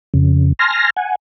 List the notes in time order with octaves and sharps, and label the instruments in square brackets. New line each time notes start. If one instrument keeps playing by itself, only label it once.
[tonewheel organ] F2 C#3
G#5 A5 C6 F6 A#6
F#5 G#5